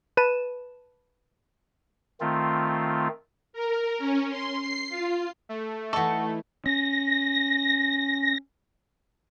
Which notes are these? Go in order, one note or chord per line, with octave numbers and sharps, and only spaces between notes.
B4 A5 D#7 E7
D#3 A3 C4 F4
A#4
C#4
C6
C7
F4
A3
E3 D#4 F#4 A4 C#6
C#4 A#6